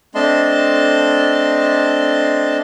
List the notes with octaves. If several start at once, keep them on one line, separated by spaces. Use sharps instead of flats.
A3 C4 D4 D#5 A5 C6